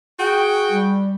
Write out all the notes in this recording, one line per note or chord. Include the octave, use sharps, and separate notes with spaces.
F#4 G#4 G5
G3